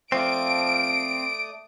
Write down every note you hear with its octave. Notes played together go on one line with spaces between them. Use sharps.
F3 A3 C4 D5 D#6 D7